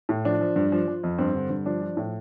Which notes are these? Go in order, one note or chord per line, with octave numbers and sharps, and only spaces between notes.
A2
F3 D4
F3
G2
F3
F3
F2
G2 C4
D3
G2
F3 D4
F3
A2